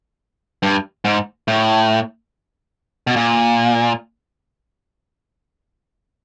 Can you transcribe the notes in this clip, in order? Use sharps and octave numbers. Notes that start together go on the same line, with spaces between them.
G2
G#2
A2
B2
A#2